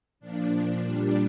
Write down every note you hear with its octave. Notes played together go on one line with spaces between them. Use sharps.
A#2 F3 D4
A#2 G3